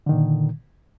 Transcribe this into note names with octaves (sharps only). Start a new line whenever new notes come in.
A#2 D3 D#3